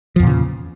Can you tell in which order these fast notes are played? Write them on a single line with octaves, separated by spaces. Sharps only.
F3 E2 A#2 C#3